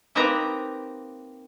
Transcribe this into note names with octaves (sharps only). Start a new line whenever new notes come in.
A#3 C4 D#4 G4 B4 A#5